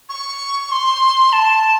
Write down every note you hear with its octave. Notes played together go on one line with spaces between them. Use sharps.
C#6
C6
A5